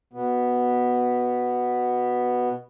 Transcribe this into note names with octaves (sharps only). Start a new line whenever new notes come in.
B2 B3